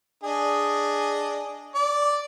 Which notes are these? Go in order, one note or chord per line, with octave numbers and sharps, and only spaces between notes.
D4 G#4 D#5
D5